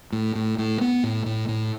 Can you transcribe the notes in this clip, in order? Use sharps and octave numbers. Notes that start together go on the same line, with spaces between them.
A2
A2
A2
B3
A2
A2
A2